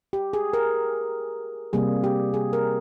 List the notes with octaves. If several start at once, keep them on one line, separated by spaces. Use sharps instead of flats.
G4
G#4
A#4
C3 G3 A#3 G#4
G4
G#4
A#4